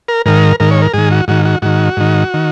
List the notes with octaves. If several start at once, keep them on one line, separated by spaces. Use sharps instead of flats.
A#4
G#2 D#3 A#4
G#2 D#3 A#4
C#5
A#4
G#2 D#3 G#4
F#4
G#2 D#3 F#4
F#4
G#2 D#3 F#4
G#2 D#3
D#3